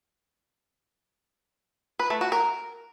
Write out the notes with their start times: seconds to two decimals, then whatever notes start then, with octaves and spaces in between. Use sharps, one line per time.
1.99 B4
2.10 A3
2.21 F#4
2.32 A#4